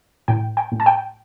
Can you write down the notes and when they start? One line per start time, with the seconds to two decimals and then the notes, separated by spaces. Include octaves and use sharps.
0.28 A2 G5
0.57 G5
0.72 A2
0.80 A5
0.86 G5